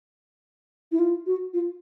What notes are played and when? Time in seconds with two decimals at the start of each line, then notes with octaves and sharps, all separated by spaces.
0.92 E4
0.99 F4
1.26 F#4
1.54 F4